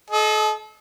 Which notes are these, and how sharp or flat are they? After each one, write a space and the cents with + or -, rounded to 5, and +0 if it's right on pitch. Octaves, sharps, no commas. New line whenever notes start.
A4 -40 D#5 +0